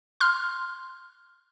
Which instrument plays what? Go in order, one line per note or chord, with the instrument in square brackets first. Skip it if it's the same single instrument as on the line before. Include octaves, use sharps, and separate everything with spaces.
[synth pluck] C6 F6